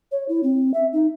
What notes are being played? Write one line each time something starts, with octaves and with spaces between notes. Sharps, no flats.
C#5
E4
C4
E5
D#4